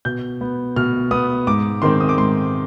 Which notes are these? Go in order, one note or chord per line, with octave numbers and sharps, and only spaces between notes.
B2 G6
B3
B2 F6
B3 D#6
G#2 D6
D#3 G#3 C4 C6
D#6
D6
G#2 C6